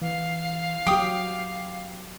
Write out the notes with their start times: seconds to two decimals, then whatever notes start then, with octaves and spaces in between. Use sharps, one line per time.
0.02 E3 F5
0.87 F#3 G4 G5 D6 D#6